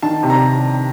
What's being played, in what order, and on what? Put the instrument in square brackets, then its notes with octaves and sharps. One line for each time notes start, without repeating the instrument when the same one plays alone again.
[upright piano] D#3 A5
C3
A#5